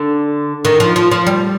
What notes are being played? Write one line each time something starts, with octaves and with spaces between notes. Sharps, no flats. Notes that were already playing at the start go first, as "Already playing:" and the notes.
Already playing: D3
D#3
F3
F3
F3
G3